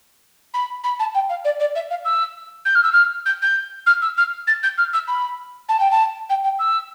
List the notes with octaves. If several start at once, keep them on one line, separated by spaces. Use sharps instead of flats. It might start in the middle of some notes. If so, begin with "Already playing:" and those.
B5
B5
A5
G5
F5
D5
D5
E5
F5
E6
G6
F6
E6
F6
G6
G6
F6
E6
F6
A6
G6
F6
E6
B5
A5
G5
A5
G5
G5
E6